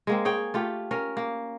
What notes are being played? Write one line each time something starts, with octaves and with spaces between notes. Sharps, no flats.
G#3 A#3 C4
G#4 C#5 G5
A3 F4 G4
C#4 A#4
A#3